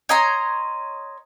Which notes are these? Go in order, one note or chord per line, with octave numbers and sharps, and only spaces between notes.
C#5 D#5 A#5 C6